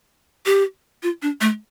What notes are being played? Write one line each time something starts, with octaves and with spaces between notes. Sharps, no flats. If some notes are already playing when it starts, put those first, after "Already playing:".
G4
F4
D4
A3